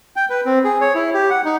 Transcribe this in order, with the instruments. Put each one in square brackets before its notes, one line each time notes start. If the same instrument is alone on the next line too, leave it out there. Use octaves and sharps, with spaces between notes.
[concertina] G5
B4
C4
G#4
C#5
E4
G4
F#5
D#4